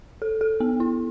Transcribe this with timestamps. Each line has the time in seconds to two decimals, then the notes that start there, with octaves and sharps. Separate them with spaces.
0.22 A4
0.41 A4
0.60 B3
0.80 E4